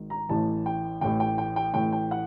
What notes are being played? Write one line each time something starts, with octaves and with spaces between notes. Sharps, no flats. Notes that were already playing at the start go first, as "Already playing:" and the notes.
Already playing: G#1 G#2 D#3
A#5
A1 A2 E3 A5
G5
A1 A2 E3 G5
G5
G5
G5
A1 A2 E3 G5
G5
F#5